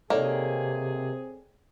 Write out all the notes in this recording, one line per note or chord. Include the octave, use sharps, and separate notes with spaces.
C3 D#3 A#3 C4 G#4 A4 C#5 D5